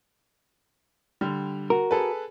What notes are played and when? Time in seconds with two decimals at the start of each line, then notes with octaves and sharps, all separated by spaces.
1.21 D3 G3
1.70 F#4 A#4
1.91 G#4 A4 B4